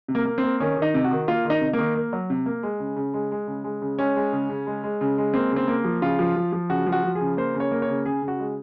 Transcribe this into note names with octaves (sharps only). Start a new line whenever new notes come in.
C3
A#3
A#3
C4
A#3
D#3 C#4
D#3 D#4
C3
F#4
D#3
A#3 F4
D#3 D#4
C3
A#3
D#3
A#3
F#3
C3
A#3
G#3
C#3
C#3
G#3
G#3
C#3
G#3
C#3
G#3 C#4
G#3
C#3
C#3
G#3
G#3
C#3
G#3
A#3 C4
C#3
C4
A#3
F3
C#3 F4
F3
F3
F3
C#3 F#4
F3
F#4
F3
G#4
C#3
A#3 C5
C#3
C#5
A#3
C#5
C#3
C#3 G#4
C#3
F#4
G#3